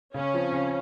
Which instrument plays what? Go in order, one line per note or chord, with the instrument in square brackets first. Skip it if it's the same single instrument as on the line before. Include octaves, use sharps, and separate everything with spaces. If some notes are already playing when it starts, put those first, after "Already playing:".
[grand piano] C#3 [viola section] C#4
[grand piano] F3 C4
C#3